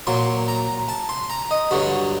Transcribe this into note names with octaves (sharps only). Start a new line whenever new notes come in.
A#2 F#3 C6
A#5
A5
C6
A#5
D#5
G2 D3 F#3 F#4